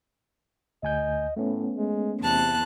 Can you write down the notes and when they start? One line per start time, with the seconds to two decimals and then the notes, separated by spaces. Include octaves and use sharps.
0.83 D2 D#5 G#5 G6
1.37 A2 A3 B3 C#4
1.77 G#3
2.22 E2 C3 A5 F#6